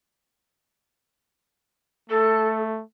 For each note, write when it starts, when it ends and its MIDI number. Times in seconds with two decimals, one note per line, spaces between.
2.09 2.82 57
2.09 2.61 69